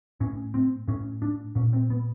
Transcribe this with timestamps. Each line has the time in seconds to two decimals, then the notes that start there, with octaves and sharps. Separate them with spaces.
0.20 A2 C#4
0.54 C4
0.88 A2 C#4
1.22 D4
1.55 A#2 C#4
1.73 C4
1.90 B3